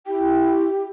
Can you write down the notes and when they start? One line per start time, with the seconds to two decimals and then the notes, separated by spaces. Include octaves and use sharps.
0.07 E4 G4 G5